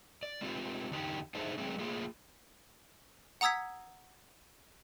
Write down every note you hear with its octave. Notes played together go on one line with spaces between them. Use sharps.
D5
G#3 C4 F4 G4
E2 D3 D4 D#4 F#4 G4
D4 D#4 G#4 A4 C5 E5
F#3 G#3 A3 C4 G#4
A3 A#3 F4 G#4
F#5 A#5 D#6 E6 G#6 B6